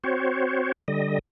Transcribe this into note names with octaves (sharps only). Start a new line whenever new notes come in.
C4 F#4 C5 C#5
D3 G3 D#5